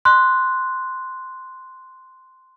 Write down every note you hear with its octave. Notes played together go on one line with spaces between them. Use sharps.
C6 F#6